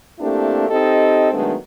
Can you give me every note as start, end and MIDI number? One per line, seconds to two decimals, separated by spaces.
0.19 0.67 57
0.19 0.67 58
0.19 0.67 60
0.19 0.67 62
0.19 0.67 64
0.19 0.67 67
0.69 1.30 60
0.69 1.30 63
0.69 1.30 67
0.69 1.30 69
0.69 1.30 75
1.33 1.55 51
1.33 1.55 54
1.33 1.55 56
1.33 1.55 57
1.33 1.55 59
1.33 1.55 62